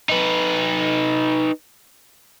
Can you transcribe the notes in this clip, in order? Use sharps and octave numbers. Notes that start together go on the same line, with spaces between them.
D#4 B4